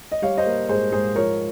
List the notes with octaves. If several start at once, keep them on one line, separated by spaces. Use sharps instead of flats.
D#5
G3 C#5 F5
C5 D#5
A#3
G#2 G#4 C5
G#2 G#4 C5
F3 A#4 C#5